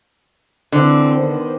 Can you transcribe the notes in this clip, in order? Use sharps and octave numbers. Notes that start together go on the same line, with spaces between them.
D3 E3 C4
D#3 B3 C5